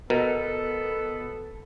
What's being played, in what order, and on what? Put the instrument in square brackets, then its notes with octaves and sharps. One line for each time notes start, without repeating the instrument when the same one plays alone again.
[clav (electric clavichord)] B2 [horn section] B3 A4 [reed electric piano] A#4